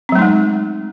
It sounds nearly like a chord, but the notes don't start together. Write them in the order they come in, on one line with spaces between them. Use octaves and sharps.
C4 F#3 A3 D#4 G#3